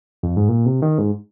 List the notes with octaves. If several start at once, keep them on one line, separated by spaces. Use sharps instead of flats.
F2
G#2
A#2
C3
D#3
G#2